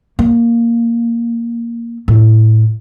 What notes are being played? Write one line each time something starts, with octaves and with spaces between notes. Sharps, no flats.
A#3
A2